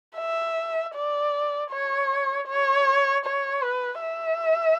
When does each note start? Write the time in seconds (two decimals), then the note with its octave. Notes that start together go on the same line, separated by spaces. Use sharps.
0.17 E5
0.94 D5
1.71 C#5
2.48 C#5
3.25 C#5
3.63 B4
4.01 E5